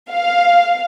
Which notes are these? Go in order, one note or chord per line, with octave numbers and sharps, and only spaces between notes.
F5